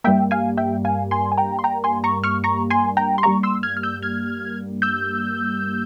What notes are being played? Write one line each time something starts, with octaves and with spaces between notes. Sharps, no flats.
G2 G3 A#3 E5 G5
F5 G#5
E5 G5
F5 G#5
G#5 C6
G#5
G5 A#5
C6
G5 A#5
G#5 C6
A#5 C#6
C#6 F6
A#5 C#6
G#5 C6
G5 A#5
C6
G2 G3 A#3 A#5 C#6
C6 E6
F6 G#6
F6
E6 G6
F6 G#6
E6 G6